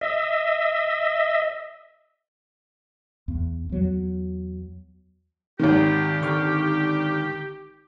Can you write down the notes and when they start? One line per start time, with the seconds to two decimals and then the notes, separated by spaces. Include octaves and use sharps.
0.01 D#5 E5
3.28 E2
3.69 E2 F#3
5.59 G#1 D#3 G4
6.21 D3 C#6 F6